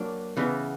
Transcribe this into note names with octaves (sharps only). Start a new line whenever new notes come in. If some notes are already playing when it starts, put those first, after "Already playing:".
Already playing: F#3 A#3 D4
C#3 E3 B3